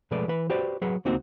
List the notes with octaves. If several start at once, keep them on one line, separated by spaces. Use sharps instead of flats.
B2 F3 G#3 A3 B4 D5
E3 B4
F#4 G4 B4 C5 D5
F#3 G#4 B4 F#5
C#2 A#3 C4 D#4 F#4